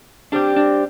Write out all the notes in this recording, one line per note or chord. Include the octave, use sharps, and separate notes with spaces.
G3 C4 D4 G4
D4